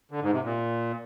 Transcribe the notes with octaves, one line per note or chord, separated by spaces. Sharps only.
D3
G#2
C3
A#2